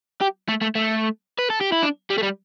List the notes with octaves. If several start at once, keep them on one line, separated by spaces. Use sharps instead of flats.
G4
A3
A3
A3
B4
A4
G4
E4
D4
G3
A3
G3